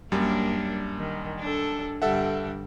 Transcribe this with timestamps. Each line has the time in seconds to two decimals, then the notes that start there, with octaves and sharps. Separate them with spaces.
0.12 F#2 G3 A#3 D4
0.98 D#3
1.39 D4 A4
2.02 G2 D3 G3 A4 E5 F#5